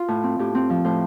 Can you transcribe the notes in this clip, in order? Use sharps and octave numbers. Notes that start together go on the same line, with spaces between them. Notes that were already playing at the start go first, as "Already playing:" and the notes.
Already playing: F4
A2
C4
A2 G4
C4
F3
A2 C5